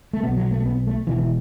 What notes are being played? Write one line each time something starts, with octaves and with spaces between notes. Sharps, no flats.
A3
B1 B2 B3
F#3
A3
B3
A3
E1 E2 B2 E3
E3